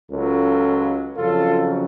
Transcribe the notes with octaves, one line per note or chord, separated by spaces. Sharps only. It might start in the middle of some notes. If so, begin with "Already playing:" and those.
C#2 C#3 F#3 F4 A4
F2 C#3 F#3 F4 A4